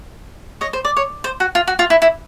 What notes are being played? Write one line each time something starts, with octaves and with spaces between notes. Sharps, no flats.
C#5 D#5
C5
D5
C#5
C5
F#4
F4
F#4
F4
E4
E4